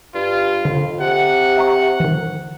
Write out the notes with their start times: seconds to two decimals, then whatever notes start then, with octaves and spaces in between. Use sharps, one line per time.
0.14 G2 F4
0.65 F2 D3
1.00 C3 F#5
1.57 E5 A#5 C#6
2.00 D#3 E3